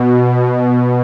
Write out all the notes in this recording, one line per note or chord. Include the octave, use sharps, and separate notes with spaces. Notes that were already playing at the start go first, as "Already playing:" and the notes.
Already playing: B2